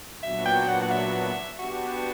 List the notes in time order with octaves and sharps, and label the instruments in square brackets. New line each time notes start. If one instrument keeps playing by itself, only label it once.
[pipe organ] A#2 F#3 B3 D4 F#4 [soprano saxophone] E5
[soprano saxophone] G5
F#5
F#5
E5
[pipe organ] B3 D4 G4 [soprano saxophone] F#4